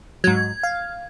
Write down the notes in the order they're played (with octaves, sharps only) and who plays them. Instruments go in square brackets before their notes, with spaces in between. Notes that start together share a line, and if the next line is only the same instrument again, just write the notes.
[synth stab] G#2 F#3 [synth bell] G#6
[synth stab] F5